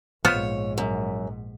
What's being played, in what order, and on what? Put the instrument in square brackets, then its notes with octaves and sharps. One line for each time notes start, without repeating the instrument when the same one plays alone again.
[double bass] A#1 G#2 [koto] B3 F4 C5 [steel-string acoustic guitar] C#5
[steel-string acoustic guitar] F#2